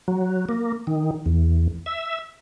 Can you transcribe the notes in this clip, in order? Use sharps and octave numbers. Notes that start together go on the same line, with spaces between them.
F#3
A#3
D#3
E2
E5